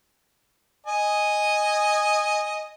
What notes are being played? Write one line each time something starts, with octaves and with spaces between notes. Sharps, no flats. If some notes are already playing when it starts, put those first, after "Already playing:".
D#5 G#5